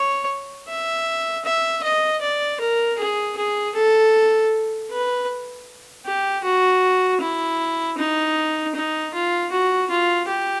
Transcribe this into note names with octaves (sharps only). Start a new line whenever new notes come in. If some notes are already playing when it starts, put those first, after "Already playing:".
Already playing: C#5
E5
E5
D#5
D5
A#4
G#4
G#4
A4
B4
G4
F#4
E4
D#4
D#4
F4
F#4
F4
G4